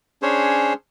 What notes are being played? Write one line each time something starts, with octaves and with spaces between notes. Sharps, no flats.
C#4 D4 G#4 C5 C#5